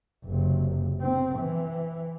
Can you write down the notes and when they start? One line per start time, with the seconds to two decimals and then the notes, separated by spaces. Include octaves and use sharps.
0.25 F#1 C3
1.01 C4
1.39 E3